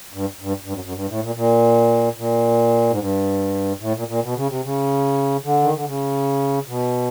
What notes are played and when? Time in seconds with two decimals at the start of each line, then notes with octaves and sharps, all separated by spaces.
0.13 G2
0.41 G2
0.64 G2
0.74 F#2
0.84 F#2
0.94 G2
1.08 A2
1.22 A#2
1.35 A#2
2.18 A#2
2.90 G#2
2.99 G2
3.80 A2
3.95 A#2
4.08 A#2
4.22 B2
4.35 C#3
4.49 C3
4.63 C#3
5.44 D3
5.63 D#3
5.74 D3
5.86 C#3
6.67 B2